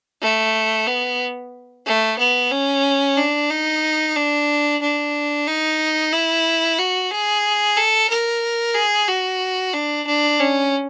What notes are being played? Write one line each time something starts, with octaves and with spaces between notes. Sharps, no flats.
A3
B3
A3
B3
C#4
D4
D#4
D4
D4
D#4
E4
F#4
G#4
A4
A#4
G#4
F#4
D4
D4
C#4